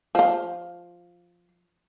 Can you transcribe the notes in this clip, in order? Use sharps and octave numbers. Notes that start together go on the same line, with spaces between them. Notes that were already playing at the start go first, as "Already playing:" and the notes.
F3 F4